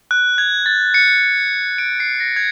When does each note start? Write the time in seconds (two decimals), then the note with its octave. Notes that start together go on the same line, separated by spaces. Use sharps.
0.11 F#6
0.38 G#6
0.66 A6
0.94 C#7
1.78 D7
2.00 C7
2.20 A#6
2.36 G#6